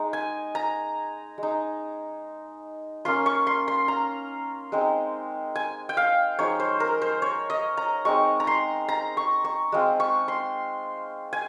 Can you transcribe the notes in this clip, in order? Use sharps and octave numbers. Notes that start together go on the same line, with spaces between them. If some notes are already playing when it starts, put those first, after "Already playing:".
Already playing: G#3 D#4
G#5
A#5
G#3
D#4
A#3 C#4 F4 C6
C#6
C6
C6
A#5
G#3 C4 D#4
G#5
G5
F5
F3 G#3 D#4 C#5
C5
A#4
C5
C#5
D#5
A#5
G#3 C4 D#4 C#6
A#5
C6
A#5
C#6
C#6
G#3 C4 F4
C#6
C6
G#5